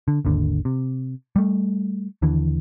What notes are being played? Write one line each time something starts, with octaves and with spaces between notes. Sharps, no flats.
D3
G#1 D#2 D3
C3
G3 A3
D#2 D3 E3